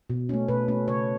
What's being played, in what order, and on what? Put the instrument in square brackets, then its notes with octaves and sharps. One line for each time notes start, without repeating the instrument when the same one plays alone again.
[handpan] B2
A3 C#4
B2 B4
A3 C#4
C#3 C#5